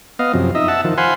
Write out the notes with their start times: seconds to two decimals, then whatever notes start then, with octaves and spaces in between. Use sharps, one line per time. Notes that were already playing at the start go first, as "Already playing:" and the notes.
0.19 B3 D#5 F5
0.34 F#2 C3 F3
0.55 D#4 D#5 E5
0.68 E5 F#5 A5
0.85 D#3 F3
0.98 C5 F5 F#5 G#5 B5 C6